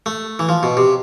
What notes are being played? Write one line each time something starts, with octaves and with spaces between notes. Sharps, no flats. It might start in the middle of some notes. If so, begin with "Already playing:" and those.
A3
E3
F3
B2
C3